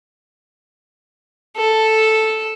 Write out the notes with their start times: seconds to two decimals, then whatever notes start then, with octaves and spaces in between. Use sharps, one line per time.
1.57 A4